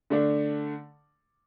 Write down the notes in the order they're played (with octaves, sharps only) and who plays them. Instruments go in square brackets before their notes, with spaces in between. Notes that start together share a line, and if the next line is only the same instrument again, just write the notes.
[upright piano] D3 A3 D4